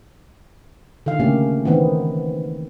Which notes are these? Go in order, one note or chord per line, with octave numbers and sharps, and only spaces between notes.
D3 D#3 F5
A#2 C#3 A3 A#3 C#4 G4
D#3 E3 B3 C4